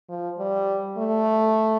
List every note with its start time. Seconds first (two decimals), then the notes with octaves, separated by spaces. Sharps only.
0.09 F3
0.38 G3
0.98 A3